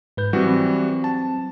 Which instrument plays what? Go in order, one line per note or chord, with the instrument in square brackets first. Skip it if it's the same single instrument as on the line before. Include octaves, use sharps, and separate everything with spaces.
[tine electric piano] G#2 B4 G6
[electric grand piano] E3 G3 F#4 [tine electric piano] F#3 C4
[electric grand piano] A5